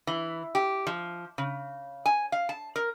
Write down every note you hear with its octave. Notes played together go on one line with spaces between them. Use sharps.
E3
G4
F3
C#3
G#5
F5
A5
A#4